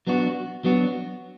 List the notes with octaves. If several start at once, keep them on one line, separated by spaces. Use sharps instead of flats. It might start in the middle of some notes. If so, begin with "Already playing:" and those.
F#3 B3 D4 F#4
F#3 B3 D4 F#4